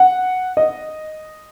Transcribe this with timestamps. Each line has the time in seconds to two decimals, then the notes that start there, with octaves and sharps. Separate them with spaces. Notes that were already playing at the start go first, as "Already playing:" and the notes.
Already playing: F#5
0.57 D#5